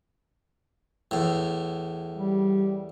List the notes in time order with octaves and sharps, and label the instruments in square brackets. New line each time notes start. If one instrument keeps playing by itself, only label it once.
[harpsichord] E2 A2
[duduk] G3